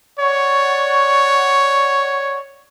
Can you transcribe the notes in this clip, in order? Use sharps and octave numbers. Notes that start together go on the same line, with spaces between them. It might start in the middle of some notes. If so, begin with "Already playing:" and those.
C#5 D5 F#5 C#6